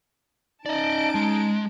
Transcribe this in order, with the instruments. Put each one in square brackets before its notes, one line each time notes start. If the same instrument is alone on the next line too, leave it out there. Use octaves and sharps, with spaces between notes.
[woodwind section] C#4 D#4 [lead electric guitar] D5 D#5 [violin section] A5 D7
[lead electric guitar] G#3